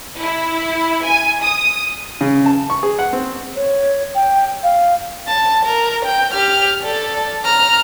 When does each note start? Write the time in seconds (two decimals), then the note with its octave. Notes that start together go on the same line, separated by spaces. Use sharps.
0.21 E4
1.06 G#5
1.42 D#6
2.21 C#3
2.46 A5
2.70 C#6
2.83 G#4
2.99 F#5
3.13 C4
3.56 C#5
4.15 G5
4.63 F5
5.28 A5
5.65 A#4
6.05 G5
6.34 G4 F6
6.82 A4 D5
7.45 A#5 F6